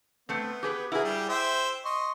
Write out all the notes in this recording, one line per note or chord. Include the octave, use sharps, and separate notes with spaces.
A3 B3 C4
G4 G#4 B4
E4 F#4 G#4 A#4 B4
G3 G4
C5 E5 G5
D#5 C6 C#6